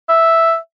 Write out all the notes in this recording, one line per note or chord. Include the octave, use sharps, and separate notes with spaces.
E5